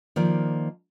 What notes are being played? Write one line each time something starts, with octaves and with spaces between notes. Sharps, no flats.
D#3 F3 A#3 D5